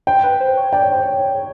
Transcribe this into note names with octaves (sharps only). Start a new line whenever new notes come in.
C5 G5
B4
C5
C#5
D5 G5
C#5
C5
C#5